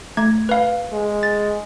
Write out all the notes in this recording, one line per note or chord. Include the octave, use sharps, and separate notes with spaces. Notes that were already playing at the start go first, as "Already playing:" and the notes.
A3 G#6
B4 F5
G#3
A6